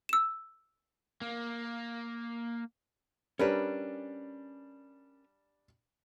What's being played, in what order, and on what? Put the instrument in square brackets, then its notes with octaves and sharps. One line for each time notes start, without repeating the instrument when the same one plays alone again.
[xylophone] E6 E7
[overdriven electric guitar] A#3
[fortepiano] G3 D4 [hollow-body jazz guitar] C#4 A#4 B4